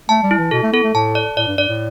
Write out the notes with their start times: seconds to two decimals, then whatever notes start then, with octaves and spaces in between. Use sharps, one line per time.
0.09 A3 A5
0.23 G3
0.31 E4
0.38 E3
0.51 B2 A4
0.63 A3
0.72 B3 A4
0.84 A3
0.95 A2 A5
1.15 D5
1.37 A2 D5
1.47 G2
1.57 G2 D5
1.68 A2